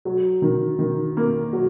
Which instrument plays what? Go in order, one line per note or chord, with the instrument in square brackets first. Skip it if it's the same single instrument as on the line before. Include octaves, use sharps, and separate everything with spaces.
[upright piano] F#3
D#3
D#3
A#3
F#3